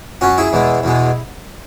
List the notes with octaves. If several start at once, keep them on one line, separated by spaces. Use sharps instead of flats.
F#2 F#3 C#4 F#4
E4 G#4
E2 B2 G#3
E2 B2 G#3